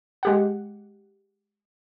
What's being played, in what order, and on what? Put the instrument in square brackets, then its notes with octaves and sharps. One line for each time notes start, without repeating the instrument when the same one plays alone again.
[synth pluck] G#3 G4 F#5